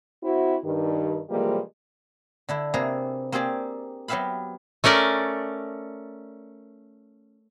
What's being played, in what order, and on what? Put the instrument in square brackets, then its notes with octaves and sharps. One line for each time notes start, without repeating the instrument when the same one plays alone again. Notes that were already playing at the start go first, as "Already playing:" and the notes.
[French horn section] C4 E4 F#4
G2 D#3
C3 E3 F3 G3 G#3 A#3
[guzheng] D3 D4 E4
C3 A#3 G#4 B4 A#5
A#3 C4 G4 G#4 D5
F#3 B3 G4 E5 F5 B5
[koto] A3 C#4 A#4 D5